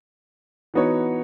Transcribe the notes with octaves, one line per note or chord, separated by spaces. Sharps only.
E3 B3 D#4 F#4 C#5